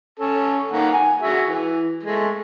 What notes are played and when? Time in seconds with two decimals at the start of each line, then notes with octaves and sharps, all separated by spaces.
0.19 C#4 A4
0.71 D#3 A#3 F#5
0.93 G#5
1.21 F#4 G#4 E5
1.48 E3
2.03 G#3 A3